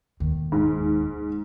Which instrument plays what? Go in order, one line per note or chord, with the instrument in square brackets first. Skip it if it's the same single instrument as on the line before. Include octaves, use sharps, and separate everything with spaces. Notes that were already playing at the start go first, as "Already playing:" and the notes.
[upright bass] E1 D#2
[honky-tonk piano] G#2